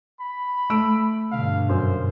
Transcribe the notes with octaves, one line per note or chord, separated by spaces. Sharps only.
B5
A3 E6 D7
G2 B2 D3 F5
F#2 C5